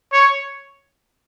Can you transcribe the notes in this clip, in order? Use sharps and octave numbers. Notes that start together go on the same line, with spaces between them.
C#5